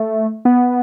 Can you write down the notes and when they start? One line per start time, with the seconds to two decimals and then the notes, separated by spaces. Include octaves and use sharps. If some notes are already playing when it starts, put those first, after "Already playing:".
Already playing: A3
0.45 B3